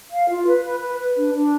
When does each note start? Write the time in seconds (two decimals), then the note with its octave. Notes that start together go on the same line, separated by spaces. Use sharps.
0.11 F5
0.29 F4
0.46 B4
0.64 B4
0.81 B4
0.99 B4
1.17 D4
1.34 D4